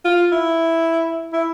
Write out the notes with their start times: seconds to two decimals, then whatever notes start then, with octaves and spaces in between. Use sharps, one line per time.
0.04 F4
0.32 E4
1.33 E4